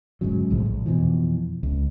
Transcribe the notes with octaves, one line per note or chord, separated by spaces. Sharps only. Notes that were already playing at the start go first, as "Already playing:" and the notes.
G1 G#2 C#3 F#3
B1 A2 F3 G#3
A#1
F2 B2 E3 F3
C#2